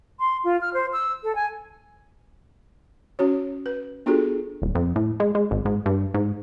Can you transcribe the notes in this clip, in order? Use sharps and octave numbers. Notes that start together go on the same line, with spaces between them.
C6
F4
F6
C5
E6
A4
G#5
C#4 F#4 C#5
B4
B3 D4 F4 F#4 G#4 A4
D#1
F2
A2
G#3
G#3
G#1
G#2
G2
G#2